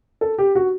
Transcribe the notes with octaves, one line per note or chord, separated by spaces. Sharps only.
A4
G4
F#4